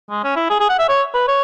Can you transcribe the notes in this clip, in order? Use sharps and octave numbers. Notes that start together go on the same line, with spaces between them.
G#3
C#4
E4
G#4
G#4
F#5
E5
C#5
B4
C#5